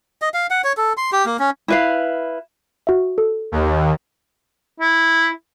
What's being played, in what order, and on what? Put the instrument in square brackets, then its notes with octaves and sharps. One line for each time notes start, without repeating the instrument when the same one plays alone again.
[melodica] D#5
F5
F#5
C#5
A4
C6
G4
A#3
C#4
[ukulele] E4 B4 F5
[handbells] F#4 E5
A4
[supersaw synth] D#2
[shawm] E4